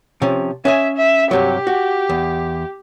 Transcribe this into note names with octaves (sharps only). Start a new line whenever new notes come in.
C3 F3 C#4
C#4 D#5 E5 G#5
E5
G2 C3 F#3 G4
F#4
E2